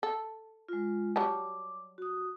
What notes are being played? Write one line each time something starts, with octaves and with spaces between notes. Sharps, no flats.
A4
G#3 F4
F#3 G3 A5 D6
F#4 D#6